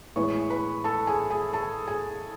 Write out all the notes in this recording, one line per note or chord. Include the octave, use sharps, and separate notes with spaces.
A2 E3 G#3 B3 C#5 C#6
B4 B5
A4 A5
G#4 G#5
G#4 G#5
A4 A5
G#4 G#5